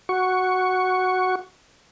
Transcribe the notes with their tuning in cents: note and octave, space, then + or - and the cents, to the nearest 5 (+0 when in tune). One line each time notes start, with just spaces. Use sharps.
F#4 +0 C#6 +5